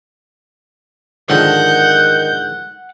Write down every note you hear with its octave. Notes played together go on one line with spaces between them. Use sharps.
G#2 D3 D#3 F3 F#5 G6